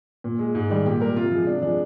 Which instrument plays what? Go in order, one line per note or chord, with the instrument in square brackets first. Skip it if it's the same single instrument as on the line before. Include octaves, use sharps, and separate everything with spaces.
[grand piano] A#2
G#3
G#2
D#3 G3
A#2 G4
G3 A#4
C3 F4
F3 G#3
C3 D4
F3 G#3 D4